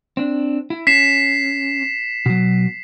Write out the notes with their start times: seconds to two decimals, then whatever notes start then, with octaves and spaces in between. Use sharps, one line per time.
0.17 C4 D4
0.70 E4
0.87 C#4 B6 C7 E7
2.26 B2 F#3